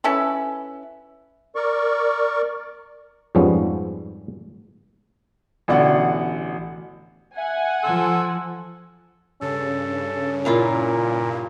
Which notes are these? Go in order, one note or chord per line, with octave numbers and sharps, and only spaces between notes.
C#4 E4 A4 B4
A#4 D5 C#6
F2 G#2 F3 G3 B3 C#4
A1 B2 D3 D5 F#5
E5 F#5 G#5
F3 A4 C6
G2 C#3 C#4 A4
A#2 A#3 E4 F4